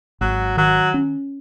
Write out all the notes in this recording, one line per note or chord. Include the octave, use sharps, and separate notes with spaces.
G#1 F#3
D#3 F#3
C#4